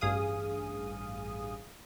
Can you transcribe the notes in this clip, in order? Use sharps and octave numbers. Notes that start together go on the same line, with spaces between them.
A1 G2 G#4 F5 D#6